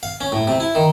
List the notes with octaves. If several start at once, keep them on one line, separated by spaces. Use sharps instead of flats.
F5
C#4
A2
C3
E4
D#3